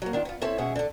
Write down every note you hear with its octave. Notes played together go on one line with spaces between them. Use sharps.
F#3 A#3
D#3 D4 F4
B3 F4
C4 E4 A4 B4 C#5 E5
B2 G#3 C#4 G#4 E5 F#5
D3 A4